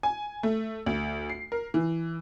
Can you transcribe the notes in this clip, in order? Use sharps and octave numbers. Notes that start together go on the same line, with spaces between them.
G#5
A3
D2
C7
A#4
E3